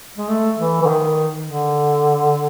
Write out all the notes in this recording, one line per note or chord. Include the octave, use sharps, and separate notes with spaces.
G#3
A3
E3
E3
D#3
D3